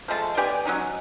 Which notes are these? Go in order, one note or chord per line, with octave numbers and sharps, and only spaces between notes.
F3 G#3 A3 A5
B3 G4 D5 G#5
F#3 G3 C#4 D#4